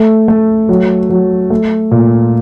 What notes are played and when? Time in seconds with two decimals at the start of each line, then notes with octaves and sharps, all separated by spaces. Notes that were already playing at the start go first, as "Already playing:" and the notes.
Already playing: A3
0.28 A3
0.69 F#3
1.10 F#3
1.50 A3
1.91 A#2